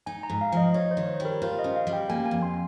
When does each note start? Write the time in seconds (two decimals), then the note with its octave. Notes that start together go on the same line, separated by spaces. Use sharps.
0.06 D#4 G#5
0.23 A#5
0.30 G#2
0.41 F5
0.52 F3 D#5
0.74 D#4 C#5
0.91 C5
0.97 D#3
1.08 C#5
1.20 G3
1.25 A#4
1.42 F4 C5
1.59 D#5
1.64 C#3
1.76 F5
1.87 G3
1.93 G5
2.10 A#3 G#5
2.26 G#5
2.31 F2
2.42 C6